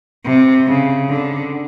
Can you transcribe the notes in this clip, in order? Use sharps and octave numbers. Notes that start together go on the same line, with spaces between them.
C3
C#3
D3